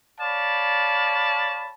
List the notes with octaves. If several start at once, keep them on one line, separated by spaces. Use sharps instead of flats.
C#5 D5 F5 A5 B5